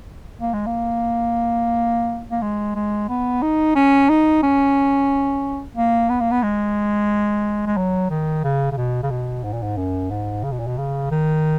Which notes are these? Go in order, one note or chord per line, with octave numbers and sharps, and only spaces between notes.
A#3
G#3
A#3
A#3
G#3
G#3
B3
D#4
C#4
D#4
C#4
A#3
B3
A#3
B3
G#3
G#3
F#3
D#3
C#3
C#3
B2
C#3
B2
G#2
A#2
G#2
F#2
G#2
C#3
B2
A#2
B2
C#3
D#3